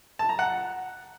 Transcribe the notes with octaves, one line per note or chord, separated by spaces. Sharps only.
A5
A#5
F#5